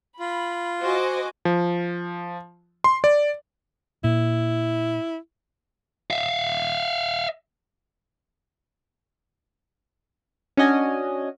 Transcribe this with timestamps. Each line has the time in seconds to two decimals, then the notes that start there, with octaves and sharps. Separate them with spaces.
0.20 F4 B5
0.81 F#4 C5 D#5 G#5 D6
1.45 F3
2.84 C6
3.04 D5
4.04 A#2 E4
6.11 E5 F5
10.57 C#4 D4 F#4 D#5 G#5